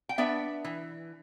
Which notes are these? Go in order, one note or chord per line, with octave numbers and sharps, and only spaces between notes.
G5
B3 D4 B4 E5
E3